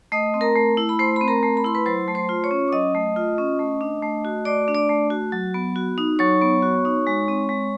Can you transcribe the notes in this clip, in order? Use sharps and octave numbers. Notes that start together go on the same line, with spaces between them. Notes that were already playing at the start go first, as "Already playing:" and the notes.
A3 D#5 D#6
C4
A#4 A#5
A3
E4
B5
A3 C5 C6
C4 B5
A#4 A#5
A3
B5
E4 C6
B4 B5
F#3 C5 C6
A3
C5 C6
F4
C#5 C#6
C#4
D6
F#3 D#5 D#6
A3
F4
C#4
A3
D4
A3
F#4
A3 D5 D6
D4
D5 D6
A3
F#4
F#3
B3
F#4
D#4
F#3 C#5 C#6
B3
F#4
D#4
G#3
C4
G#3